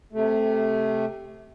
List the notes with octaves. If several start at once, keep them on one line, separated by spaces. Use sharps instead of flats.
C3 A3